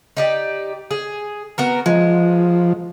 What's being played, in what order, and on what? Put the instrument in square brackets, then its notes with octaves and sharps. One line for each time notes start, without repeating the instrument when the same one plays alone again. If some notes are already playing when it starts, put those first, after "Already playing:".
[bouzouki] D#4 G4 D5
G#4
B3 F#4 A#4
[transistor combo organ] F3 [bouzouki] G#3